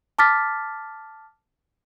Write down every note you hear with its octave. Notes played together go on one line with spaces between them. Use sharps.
A5 D6 F6 A6 B6